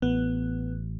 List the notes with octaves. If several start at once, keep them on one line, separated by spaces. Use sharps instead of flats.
A1 B3